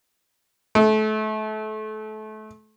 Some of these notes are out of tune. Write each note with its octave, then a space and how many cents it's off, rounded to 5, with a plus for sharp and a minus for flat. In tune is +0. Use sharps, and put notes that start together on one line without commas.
A3 -30